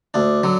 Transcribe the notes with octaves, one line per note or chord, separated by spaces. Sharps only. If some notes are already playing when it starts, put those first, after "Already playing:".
D2 D4
D3 F#3